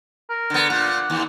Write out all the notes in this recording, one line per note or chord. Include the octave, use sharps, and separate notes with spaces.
A#4
D3 B3
A#2 F#5
D#2